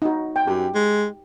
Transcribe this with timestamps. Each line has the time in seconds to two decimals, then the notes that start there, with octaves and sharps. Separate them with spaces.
0.02 D#4 F#4
0.36 G5
0.47 F#2 G4
0.75 G#3